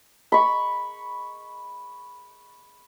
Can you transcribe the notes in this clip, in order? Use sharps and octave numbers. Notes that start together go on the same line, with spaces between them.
B5 C#6